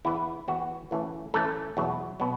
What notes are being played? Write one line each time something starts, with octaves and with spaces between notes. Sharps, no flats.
E2 E3 B3 E4
E2 E3 B3 F#4
A2 E3 A3 C#4
A2 E3 A3 C#4 A4
E2 B2 F#3
B2 F#3